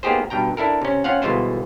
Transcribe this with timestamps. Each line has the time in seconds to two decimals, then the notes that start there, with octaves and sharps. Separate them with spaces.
0.03 A#3 B3 D#4 G4 G#4 C5
0.30 G2 B2 G5 A#5
0.57 D4 E4 A4 A#4
0.82 C3 C#4
1.04 C4 C#4 F4 F5 F#5
1.22 G1 B2 E3 G#3 F4 C5